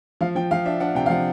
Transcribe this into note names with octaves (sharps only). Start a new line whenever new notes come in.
F3 F5
F3 G5
F3 F5
D4 E5
D4 F#5
C3 G5
F5
F3 F#5